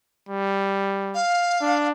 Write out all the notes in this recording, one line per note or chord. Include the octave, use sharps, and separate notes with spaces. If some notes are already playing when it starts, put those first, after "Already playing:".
G3
F5
D4